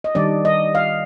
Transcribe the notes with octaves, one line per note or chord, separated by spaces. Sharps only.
D#5
D#3 G3 D4 D5
D#5
F5